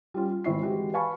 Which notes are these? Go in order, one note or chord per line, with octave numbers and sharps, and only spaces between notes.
G3 C#4 F4
F4
G#1 E3 C4 E4 C#6 C7
E3 G#3 F#4 G4
B4 F5 G#5 A5 B5 C#6